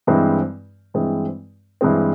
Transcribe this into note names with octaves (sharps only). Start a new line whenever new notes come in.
G2 E3 G#3 C4
G2 E3 G#3 C4
G2 E3 G#3 C4